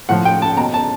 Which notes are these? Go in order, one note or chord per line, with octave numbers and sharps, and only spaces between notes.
A2 F3 F#5
G5
A5
B2 A#5
A5